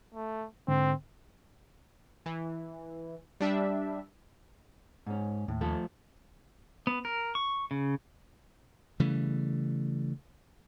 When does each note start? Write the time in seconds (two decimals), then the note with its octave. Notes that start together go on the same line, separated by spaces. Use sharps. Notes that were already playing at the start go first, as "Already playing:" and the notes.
0.14 A3
0.68 G#2 D3 C4
2.26 E3
3.40 G3 D4 E5
5.06 G#2 C#4
5.48 D#2 A2
5.61 F3 A3 A4
6.87 B3
7.05 A#4
7.35 C#6
7.71 C#3
9.00 C#3 E3 G3 A3